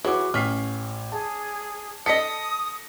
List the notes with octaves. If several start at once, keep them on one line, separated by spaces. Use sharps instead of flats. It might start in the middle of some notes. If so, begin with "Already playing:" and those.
E3 F#4 G#4 C#5 D6
A1 C#4 F6 B6 C7
G#4 A5
A4 D#5 D#6 A#6 B6 C#7